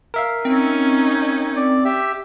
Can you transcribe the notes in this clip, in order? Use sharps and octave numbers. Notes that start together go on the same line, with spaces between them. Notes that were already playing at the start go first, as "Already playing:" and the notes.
A#4 E5 F5
C4 C#4 D#4
D5
G4 E5